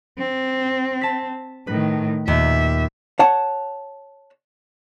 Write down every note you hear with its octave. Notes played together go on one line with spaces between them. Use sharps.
C4
A5 B6
A2 D#3 B4
D#2 A#2 E5
C#5 F#5 A5